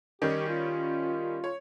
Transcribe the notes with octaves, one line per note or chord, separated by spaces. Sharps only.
D#3 G3 C#4 G4
F4
C#5